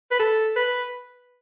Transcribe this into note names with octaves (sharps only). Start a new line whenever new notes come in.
B4
A4
B4